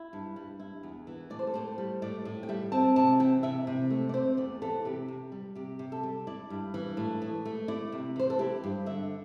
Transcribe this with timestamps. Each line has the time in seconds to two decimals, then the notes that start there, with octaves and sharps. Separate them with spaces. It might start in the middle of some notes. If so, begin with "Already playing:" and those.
Already playing: E4
0.13 G2
0.36 G3
0.60 E4
0.83 E2
1.07 E3
1.30 A2 D5
1.39 C5
1.47 A4
1.54 A2 C5
1.78 G3
2.02 A2 D5
2.25 A2
2.43 G5
2.49 G3 E5
2.72 C4 A5
2.96 C3 A5
3.20 E3 G5
3.43 C3 E5
3.67 C3
3.90 A3
4.09 D5
4.14 C4 C5
4.37 E2 D5
4.62 E3 A4
4.85 C3 G4
5.08 C3
5.32 G3
5.55 C3 G4
5.79 C3
5.92 A4
6.03 G3
6.27 E4 D5
6.50 G2
6.74 E3
6.97 A2
7.22 A2
7.45 A3
7.68 E4 D5
7.92 C3
8.16 E3 C5
8.30 A4
8.39 E4 G4
8.64 G2
8.86 D3 E5